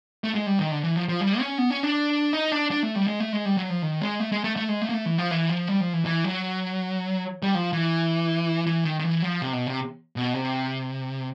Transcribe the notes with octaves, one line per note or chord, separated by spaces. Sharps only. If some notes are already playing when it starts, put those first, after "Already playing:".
A3
G#3
G3
D#3
D3
E3
F3
F3
G3
C#4
B3
C#4
D4
D#4
D4
D4
A3
G3
G#3
A3
G#3
G3
F#3
F3
D#3
G#3
A3
G#3
A3
A3
G#3
A3
A#3
A3
E3
F3
E3
F3
G3
F3
E3
E3
F#3
G3
F3
E3
E3
D#3
D#3
E3
F3
C3
B2
C3
B2
C3